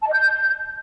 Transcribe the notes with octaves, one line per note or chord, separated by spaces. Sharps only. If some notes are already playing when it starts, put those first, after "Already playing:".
A5
D#5
G6